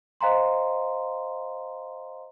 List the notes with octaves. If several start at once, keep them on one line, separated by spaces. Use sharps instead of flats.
C5 D#5 F5 G#5 A#5 C6